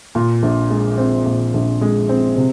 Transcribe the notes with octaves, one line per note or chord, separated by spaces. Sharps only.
A#2
A#1
G#3
C4
A#2
A#1
G#3
C4
C3